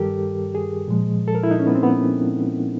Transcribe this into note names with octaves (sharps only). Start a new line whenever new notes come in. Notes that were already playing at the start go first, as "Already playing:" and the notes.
Already playing: G2 D#3 G3 G4 A4 A#4
G#4
A#2 F3 G#3
A4
A#4
E4
D#4
C#4
B3
C4
B3